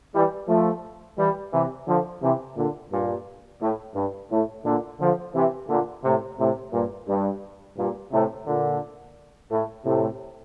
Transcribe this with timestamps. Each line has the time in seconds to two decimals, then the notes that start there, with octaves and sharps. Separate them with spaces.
0.13 E3 G3
0.48 F3 A3
1.18 E3 G3
1.52 C3 E3
1.88 D3 F3
2.22 C3 E3
2.57 A#2 D3
2.92 G2 A#2
3.61 A2
3.95 G2
4.31 A2
4.65 A#2 D3
5.00 D3 F3
5.35 C3 E3
5.69 A#2 D3
6.03 A2 C3
6.39 A2 C3
6.73 G2 A#2
7.08 G2
7.78 G2 A#2
8.12 A2 C3
8.47 A#2 D3
9.51 A2
9.85 A2 C3